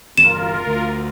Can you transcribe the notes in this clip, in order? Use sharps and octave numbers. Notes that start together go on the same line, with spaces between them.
G1 E2 F4 A#4 E7
D2